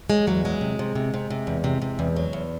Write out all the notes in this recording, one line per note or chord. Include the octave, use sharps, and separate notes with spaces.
F#3 G#3
E2 F#3
F#3 G#3
C3
C3
C3
C3
C3
E2
C3
C3
E2
F#3
E2